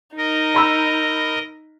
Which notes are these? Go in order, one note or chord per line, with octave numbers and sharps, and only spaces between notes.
D#4 A#4 D#5
A#5 B5 E6